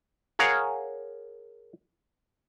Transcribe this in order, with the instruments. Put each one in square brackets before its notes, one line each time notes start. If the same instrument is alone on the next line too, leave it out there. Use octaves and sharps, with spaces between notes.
[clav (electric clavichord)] G#4 A#4 C#5 F5 F#5